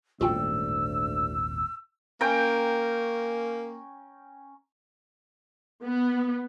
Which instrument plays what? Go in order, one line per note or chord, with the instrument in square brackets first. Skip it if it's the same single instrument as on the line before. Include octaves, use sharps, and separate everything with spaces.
[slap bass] D#1 G#1 A2 [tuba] D2 [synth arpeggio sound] F4 F#4 G5 [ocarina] E6
[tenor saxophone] A#3 [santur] C#4 G5 A#5
[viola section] B3